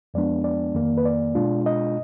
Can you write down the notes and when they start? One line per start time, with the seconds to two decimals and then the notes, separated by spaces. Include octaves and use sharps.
0.14 F2 F3 G#3 B3 D4 D5
0.44 D5
0.74 F2 D#3 A#3
0.98 B4
1.05 D5
1.35 B2 G#3 D4 F4
1.66 D#5